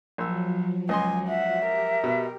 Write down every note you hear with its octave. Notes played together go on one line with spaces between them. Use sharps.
A#1 F3 F#3 E6
C#2 D#5 G#5 C6
E5 F#5
G4 A#4
B2